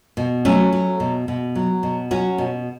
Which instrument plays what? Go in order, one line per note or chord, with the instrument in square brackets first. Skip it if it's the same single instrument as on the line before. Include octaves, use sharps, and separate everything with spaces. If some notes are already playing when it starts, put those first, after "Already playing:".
[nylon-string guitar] B2
F#3 A3 C#4
F#3
B2
B2
F#3
B2
F#3 C#4 F#4
B2